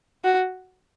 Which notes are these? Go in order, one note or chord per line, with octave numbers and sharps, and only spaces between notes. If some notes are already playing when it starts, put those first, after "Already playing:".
F#4